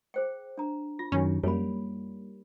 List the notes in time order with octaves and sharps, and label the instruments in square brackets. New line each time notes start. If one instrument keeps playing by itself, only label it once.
[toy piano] G#4 C5 G5
D4 A#5
[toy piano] F4 [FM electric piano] A#6
[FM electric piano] F#2 D#3 F#3 [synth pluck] C#4 [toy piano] D#4
[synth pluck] F#2 [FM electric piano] G3 A#3 [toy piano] C#5 B5